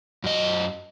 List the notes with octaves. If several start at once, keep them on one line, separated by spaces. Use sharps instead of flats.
F#2 D#5